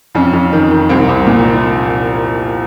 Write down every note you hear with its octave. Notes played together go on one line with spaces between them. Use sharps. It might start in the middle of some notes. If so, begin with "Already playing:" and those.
F2 C#4
F2
D#3
D#3
C2 C4
C2
A#2